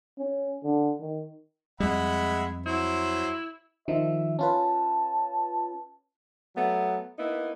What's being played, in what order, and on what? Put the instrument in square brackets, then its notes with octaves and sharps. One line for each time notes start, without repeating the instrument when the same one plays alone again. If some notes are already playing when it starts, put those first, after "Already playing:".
[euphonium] C#4
D3
D#3
[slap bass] F2 G3 [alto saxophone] G#3 [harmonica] E5 F#5 B5
[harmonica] F#3 C5 [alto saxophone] E4
[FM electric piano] D#3 F3 D#4 [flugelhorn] E5
[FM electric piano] C#4 F4 B4 [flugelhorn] A5
[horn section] F#3 A3 B3
A#3 B3 D#4 E4